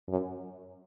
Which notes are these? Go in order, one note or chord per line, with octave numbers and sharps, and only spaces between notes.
F#2